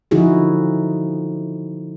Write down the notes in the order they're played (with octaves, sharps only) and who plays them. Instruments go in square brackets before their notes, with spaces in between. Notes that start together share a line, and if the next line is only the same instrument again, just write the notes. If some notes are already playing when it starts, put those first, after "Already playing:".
[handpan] D3 F3 D#4 E4 F#4 G#4